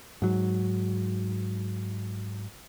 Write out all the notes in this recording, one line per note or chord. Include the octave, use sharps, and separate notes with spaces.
G#2 F#3